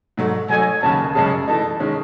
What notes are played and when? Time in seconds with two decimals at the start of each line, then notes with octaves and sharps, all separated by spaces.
0.17 G#2 F#3 A3
0.49 F#3 A3 D#4 A4 C#5 G#5
0.83 D#2 C#3 F#3 C#4 A5
1.15 F#2 C#3 G#3 C#4 G#4 A5
1.48 E3 A3 D#4 A5
1.80 D#3 G#3 C#4